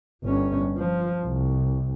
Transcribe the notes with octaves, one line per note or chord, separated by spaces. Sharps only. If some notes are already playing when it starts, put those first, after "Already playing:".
G1 C#4
F3
C2